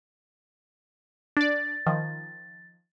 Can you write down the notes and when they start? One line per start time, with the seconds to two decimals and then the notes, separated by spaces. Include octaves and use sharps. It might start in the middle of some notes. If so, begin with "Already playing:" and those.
1.37 D4 D5 A6
1.86 D#3 F3